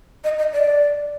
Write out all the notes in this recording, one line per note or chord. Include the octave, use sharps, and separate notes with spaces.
D#5
D#5
D5